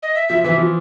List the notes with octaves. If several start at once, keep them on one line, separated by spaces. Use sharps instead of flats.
D#5
E5
F3 E5
E3 E5
F3